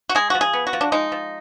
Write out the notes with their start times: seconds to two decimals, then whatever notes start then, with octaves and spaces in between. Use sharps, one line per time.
0.09 F#4
0.15 G#3 G#4
0.30 F3 F#4
0.41 G#4
0.53 B3
0.67 F#4
0.73 F3
0.81 D4
0.92 G#3 D#4
1.12 F3